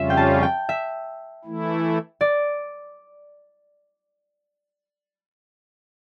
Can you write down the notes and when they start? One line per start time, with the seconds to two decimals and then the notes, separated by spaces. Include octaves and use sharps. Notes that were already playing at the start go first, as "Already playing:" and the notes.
Already playing: F2 C#3 G3 C#4 F4 E5
0.10 G5
0.17 A5
0.43 G5
0.69 E5
1.45 E3 A3 E4
2.21 D5